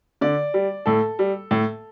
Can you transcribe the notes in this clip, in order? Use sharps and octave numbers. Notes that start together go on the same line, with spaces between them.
D3 D5
G3
A2 A4
G3
A2